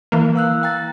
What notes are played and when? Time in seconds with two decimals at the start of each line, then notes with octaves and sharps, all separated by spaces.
0.12 E3 A#3
0.36 F5 E6 F#6
0.63 G5 A#5 A6